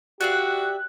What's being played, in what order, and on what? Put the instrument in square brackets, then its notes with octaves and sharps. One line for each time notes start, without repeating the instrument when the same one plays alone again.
[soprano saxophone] F#4 [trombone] G4 [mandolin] D5 E5 F5 [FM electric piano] F#6